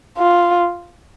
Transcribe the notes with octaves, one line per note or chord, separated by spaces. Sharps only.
F4